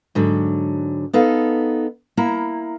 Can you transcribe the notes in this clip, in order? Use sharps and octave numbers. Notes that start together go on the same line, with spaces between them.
G#2 D3 F#3
B3 D#4 A4 F5
A#3 E4 A#5